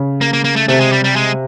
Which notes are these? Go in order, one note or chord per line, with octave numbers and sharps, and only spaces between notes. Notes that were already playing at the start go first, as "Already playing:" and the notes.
Already playing: C#3
A#3
A#3
A#3
A3
C3 A3
G#3
G3
G3
G#3